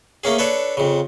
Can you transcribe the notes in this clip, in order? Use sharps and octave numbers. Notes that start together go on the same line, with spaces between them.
A3 A#3 C#4 G#4
D4 A4 B4 C#5
F2 C#3